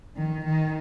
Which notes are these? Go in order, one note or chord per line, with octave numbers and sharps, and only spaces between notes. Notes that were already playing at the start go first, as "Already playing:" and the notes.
D#3
D#3